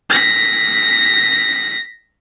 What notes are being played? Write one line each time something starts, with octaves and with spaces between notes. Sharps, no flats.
A#6 B6